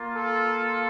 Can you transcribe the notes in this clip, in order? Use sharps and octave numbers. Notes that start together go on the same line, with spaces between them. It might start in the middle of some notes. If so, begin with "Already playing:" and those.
Already playing: A#3 F4
A4